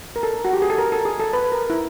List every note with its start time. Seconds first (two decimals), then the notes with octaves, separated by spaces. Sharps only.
0.16 A#4
0.23 A4
0.45 F#4
0.54 G4
0.62 G#4
0.70 A4
0.78 A#4
0.92 A4
1.05 G#4
1.20 A4
1.33 B4
1.52 A#4
1.70 E4